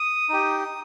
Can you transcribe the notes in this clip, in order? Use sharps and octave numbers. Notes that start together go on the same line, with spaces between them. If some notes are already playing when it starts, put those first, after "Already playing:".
Already playing: D#6
D#4 G4